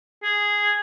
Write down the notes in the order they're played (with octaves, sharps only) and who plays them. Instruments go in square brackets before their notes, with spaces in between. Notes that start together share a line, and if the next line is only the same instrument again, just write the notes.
[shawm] G#4